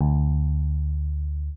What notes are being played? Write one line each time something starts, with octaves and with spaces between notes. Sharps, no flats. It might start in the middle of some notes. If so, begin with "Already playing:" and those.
D2